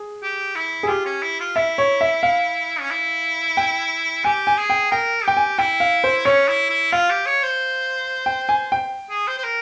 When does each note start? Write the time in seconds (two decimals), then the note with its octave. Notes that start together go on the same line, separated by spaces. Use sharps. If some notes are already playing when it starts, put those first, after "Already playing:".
Already playing: G#4
0.23 G4
0.55 E4
0.83 G#4
0.89 F4 G4
1.06 C#4
1.22 E4
1.40 F4
1.56 E4 E5
1.78 C#5
2.01 E5
2.23 F5
2.80 C#4
2.91 E4
3.57 G5
4.24 G4 G#5
4.47 G#5
4.58 G#4
4.70 G5
4.91 A#4 G5
5.25 G4 G5
5.37 G#5
5.58 E4 G5
5.80 F5
6.04 C5
6.25 C#4 C#5
6.48 E4
6.70 E4
6.92 F4 F5
7.10 G4
7.26 C#5
7.43 C5
8.26 G5
8.49 G#5
8.72 G5
9.10 G#4
9.28 C5
9.38 C5
9.44 A#4